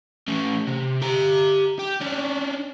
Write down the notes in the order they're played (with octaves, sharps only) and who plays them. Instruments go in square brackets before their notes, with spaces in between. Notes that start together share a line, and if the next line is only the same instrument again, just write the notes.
[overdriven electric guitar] A2 C#4
C3
G4 A#5
G4
C#4 D4